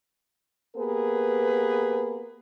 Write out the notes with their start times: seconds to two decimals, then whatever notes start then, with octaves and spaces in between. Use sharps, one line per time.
0.77 A#3 B3 G4 G#4 A#4 B4